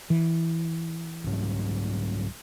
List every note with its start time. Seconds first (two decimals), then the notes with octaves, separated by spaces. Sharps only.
0.10 E3
1.24 C2 G#2 F#3